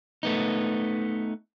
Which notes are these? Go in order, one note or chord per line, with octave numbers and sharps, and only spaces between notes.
A3 B3 D#4